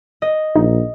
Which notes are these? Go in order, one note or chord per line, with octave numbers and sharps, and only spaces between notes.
D#5
A#1 D#4